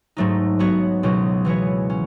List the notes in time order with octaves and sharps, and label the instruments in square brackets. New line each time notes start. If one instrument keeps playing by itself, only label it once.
[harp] G#2 F#3 A3 D#4
F#3 B3 F#4 C#5
C#2 B2 F#3 C#4 F#4
E3 B3 F#4 C#5
C#4